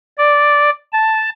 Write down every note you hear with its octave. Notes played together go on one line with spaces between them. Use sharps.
D5
A5